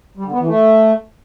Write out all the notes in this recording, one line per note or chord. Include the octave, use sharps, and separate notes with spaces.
G3
D3
B3
E3
A3